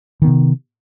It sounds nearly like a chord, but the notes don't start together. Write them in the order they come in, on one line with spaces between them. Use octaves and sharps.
D#3 B3 C3